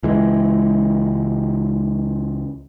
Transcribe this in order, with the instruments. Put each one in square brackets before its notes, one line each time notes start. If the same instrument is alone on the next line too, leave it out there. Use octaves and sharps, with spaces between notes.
[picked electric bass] C#2 E3 G#3